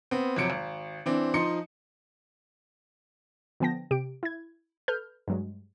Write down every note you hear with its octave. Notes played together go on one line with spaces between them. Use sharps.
B3 C4
F2 C3 F#3 C#7 D7
G#1
E3 C4 D4
F3 D#4 C6 C#7
D3 F3 B3 G5 A5 A#6
C3 G4 D7
E4 G#6
A4 B4 F6 G6
G2 F#3 G#3